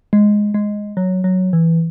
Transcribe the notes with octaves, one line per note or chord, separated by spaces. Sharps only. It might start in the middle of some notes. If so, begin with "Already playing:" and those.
G#3
G#3
F#3
F#3
E3